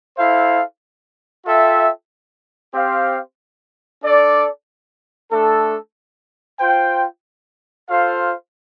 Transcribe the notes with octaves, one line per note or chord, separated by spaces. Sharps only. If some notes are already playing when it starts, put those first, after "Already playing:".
E4 A4 C5 F5
F4 A4 E5 G5
C4 G4 C5 F5
D4 A4 D5
A3 D4 A4
F4 C5 G5
F4 A4 C5 F5